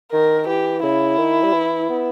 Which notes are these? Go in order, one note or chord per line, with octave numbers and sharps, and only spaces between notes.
D#3 A#4
E3 G4
C#3 E4
D#3
G3
E3
B3